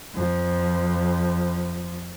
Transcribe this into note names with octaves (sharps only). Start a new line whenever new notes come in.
F2 F3